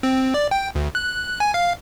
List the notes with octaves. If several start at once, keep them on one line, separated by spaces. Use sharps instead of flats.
C4
D5
G5
D2
F#6
G#5
F5